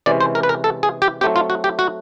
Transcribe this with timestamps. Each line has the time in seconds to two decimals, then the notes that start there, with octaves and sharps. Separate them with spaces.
0.06 C3 E3 G#3 C#4 D5
0.20 C5
0.35 A#4
0.43 B4
0.49 A#4
0.64 A4
0.83 G#4
1.02 G4
1.21 F#3 A3 C4 G4
1.36 F4
1.50 F#4
1.64 G4
1.79 F#4